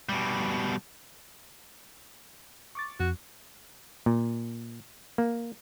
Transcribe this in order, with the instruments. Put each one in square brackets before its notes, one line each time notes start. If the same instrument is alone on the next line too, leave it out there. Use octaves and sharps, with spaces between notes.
[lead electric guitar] B2 G3
[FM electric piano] C#6 D6 A6
[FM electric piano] F2 [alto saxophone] F#4
[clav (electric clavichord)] A#2
A#3